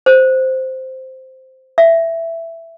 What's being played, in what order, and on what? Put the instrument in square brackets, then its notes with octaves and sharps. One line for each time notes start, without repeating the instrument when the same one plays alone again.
[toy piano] C5
E5